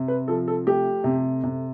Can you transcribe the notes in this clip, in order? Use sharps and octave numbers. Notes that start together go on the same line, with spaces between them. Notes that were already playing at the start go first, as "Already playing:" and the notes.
Already playing: C3
B4
F3 A4
A4
A3 G4
C3
C3